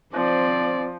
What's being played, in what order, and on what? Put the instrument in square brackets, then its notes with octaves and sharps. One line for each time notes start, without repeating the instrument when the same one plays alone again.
[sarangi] F3 [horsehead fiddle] C4 D5